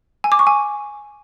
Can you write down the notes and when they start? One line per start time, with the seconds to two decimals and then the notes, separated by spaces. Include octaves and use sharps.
0.24 G#5
0.32 D6
0.39 C#6
0.47 G#5